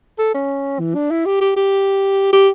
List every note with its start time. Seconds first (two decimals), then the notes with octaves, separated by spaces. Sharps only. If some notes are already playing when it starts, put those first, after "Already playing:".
0.19 A4
0.34 C#4
0.79 E3
0.95 D4
1.11 E4
1.26 G4
1.41 G4
1.56 G4
2.33 G4